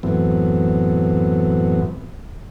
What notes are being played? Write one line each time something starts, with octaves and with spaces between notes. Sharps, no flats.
F#2 A2 E3 F#3 B3 C4